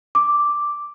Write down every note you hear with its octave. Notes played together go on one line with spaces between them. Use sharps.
D6